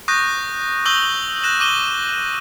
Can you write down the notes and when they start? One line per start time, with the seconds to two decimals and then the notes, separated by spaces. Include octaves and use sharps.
0.08 C#6 D#6 F#6 G6 A#6
0.86 C#6 D#6 E6 G6 F#7 G7
1.44 F#6 G6 A#6 E7
1.60 D6 D#7 G7